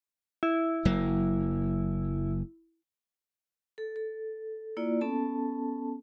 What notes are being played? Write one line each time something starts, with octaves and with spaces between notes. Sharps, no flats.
E4
F#1 F#3 A#3
A4
A4
A#3 E4 F4 D5
B3 C#4 A4 A5